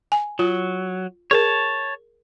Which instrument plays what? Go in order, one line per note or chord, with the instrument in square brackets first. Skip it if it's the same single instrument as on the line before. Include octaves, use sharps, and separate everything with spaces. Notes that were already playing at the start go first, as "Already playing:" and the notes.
[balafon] G#5
[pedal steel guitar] F#3 [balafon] F4
[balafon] G#4 A#4 [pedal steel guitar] C#5 A5